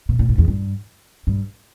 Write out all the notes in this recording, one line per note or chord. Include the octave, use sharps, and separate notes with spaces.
B2
A#2
G#2
E2
G2
G2